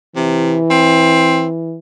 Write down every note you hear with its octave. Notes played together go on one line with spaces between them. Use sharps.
C3 E3
C4